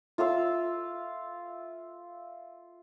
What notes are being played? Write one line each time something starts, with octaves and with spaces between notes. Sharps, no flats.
F4 E5 F5 E6